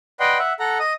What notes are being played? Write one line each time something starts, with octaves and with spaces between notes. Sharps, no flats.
B4 D5 D#5 F#5 G5 C6
E5 F#5
A4 F#5 A#5
D#5 D#6